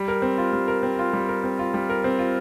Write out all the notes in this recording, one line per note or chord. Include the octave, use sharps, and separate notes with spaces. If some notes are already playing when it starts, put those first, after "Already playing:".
Already playing: G3
A#4
C4
F4
G3
A#4
C4
F4
G3
A#4
C4
F4
G3
A#4
C4
F4